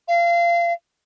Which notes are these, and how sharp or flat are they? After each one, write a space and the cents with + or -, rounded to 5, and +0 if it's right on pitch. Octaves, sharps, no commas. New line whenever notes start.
F5 -25